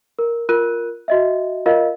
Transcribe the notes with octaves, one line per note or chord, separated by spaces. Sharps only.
A#4
F4 A#4 F#6 D#7
F#4 D#5 E5
F4 A#4 D#5 F5